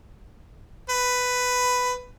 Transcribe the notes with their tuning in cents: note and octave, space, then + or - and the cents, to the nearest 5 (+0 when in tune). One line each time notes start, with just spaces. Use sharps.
B4 +10